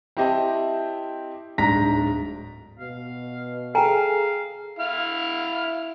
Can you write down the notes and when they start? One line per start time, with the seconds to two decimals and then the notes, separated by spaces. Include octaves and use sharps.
0.17 C4 E4 G4 D#5 E5 A5
1.58 D1 G#2 D4 A#5 A#6 B6
2.79 B2 F5
3.75 G#4 A4 F5 G5 G#5 A#5
4.79 E4 F5